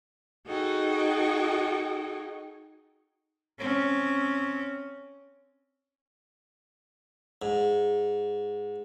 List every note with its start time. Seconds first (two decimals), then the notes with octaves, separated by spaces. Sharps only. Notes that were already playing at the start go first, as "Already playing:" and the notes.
0.47 D#4 F#4 G#4 A4 D#5 G5
3.59 C4 C#4
7.42 G#2